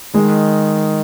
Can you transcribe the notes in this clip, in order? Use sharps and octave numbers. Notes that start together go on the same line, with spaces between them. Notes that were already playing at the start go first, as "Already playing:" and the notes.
D#3 G#3